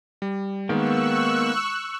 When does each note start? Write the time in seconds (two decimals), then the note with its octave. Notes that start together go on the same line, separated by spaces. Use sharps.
0.22 G3
0.69 D#3 G#3 A#3 B3 C#6 E6 F#6